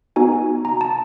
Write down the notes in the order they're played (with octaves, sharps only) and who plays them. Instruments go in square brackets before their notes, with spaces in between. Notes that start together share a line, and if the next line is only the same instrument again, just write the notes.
[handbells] B3 D#4 F#4 G#5
A#5
A5